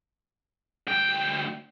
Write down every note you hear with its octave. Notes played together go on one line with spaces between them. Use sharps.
D2 G5